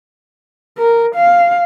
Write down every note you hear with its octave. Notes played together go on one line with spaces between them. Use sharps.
A#4
F5